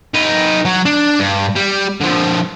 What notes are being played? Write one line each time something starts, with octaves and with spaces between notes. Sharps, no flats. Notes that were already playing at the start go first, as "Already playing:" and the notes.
D#4 B4
F#3
D4
G2
G3
D3 F3